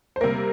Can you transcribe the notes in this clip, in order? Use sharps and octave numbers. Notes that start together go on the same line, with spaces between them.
C5
C3 G3 A#3 A#4